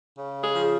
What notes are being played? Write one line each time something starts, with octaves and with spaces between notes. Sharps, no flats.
C#3
G#4
F3